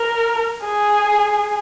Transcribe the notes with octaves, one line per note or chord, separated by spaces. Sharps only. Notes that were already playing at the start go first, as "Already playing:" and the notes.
Already playing: A#4
G#4